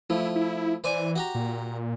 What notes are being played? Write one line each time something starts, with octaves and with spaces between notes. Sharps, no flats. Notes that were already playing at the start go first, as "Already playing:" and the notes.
F3 A3 E4
E4
E3 C5 D5 G#5
F#4 G4 A#5
A#2